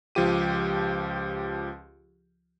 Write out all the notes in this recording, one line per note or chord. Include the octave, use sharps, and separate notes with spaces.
C#2 F3 F4 G4 D#7